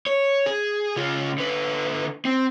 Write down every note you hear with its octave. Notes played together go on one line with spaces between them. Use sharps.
C#5
G#4
C#3 F4
D3 B4
C4